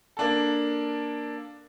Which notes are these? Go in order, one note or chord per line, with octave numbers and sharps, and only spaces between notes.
A#3 D4 A4